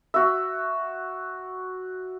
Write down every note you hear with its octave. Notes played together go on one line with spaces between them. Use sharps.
F#4 E5